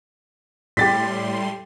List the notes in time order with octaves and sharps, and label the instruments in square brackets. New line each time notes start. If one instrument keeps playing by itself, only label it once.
[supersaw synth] A2 G3 C6 [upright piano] G4 A6 B6